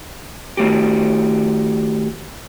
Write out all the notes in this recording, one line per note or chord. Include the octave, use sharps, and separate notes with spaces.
D#3 A3 F#4 G4